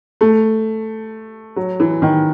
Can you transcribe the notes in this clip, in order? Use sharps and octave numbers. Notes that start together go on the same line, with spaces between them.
A3
F#3
E3
D#3